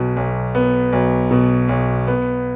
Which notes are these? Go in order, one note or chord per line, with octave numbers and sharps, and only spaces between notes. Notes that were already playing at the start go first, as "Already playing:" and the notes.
Already playing: B1 B2
B1
B3
B1
B2
B1
B3